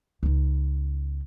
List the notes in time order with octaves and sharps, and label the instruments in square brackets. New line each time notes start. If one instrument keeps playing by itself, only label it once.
[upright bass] C#2 D#4